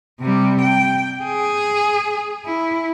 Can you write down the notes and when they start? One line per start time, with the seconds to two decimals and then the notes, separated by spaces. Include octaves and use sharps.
0.21 C3 G3
0.62 G5
1.24 G#4
2.46 E4